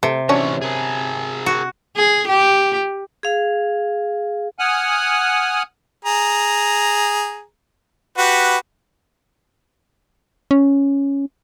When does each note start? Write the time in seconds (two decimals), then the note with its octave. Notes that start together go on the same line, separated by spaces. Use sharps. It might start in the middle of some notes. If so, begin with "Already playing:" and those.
0.03 C3 A3
0.29 E3 F#3 C#4 D4 C#5
0.62 G#4 A#4
1.46 F#4
1.97 G#4
2.28 G4
3.23 G#4 F5
4.59 F#5 G#5 D#6 F6 F#6
6.05 G#4 A#5
8.18 F#4 G4 B4
10.51 C#4